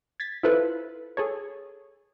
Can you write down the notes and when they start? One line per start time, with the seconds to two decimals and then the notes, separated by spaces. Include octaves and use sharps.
0.20 G#6 A6 B6
0.43 E4 F4 A4 B4 C5
1.17 G#4 A4 C#5